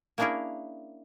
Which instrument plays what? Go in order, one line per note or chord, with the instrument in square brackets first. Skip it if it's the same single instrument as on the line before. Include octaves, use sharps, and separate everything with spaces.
[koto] A#3 C#4 D4 E4 G#4 A#4